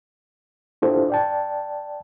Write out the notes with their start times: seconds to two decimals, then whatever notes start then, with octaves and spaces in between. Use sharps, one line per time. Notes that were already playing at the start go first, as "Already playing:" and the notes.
0.82 D4 E4 F4 G4 A4 C5
1.10 D5 G5 A5